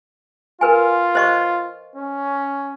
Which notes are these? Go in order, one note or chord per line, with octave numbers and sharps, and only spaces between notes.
F4 A#4 B4 G#5
C5 D#5 C#6
C#4